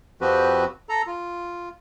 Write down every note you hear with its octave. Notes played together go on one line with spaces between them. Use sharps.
F2 F3 C4 F#4 G4 B4
A4 A#5
F4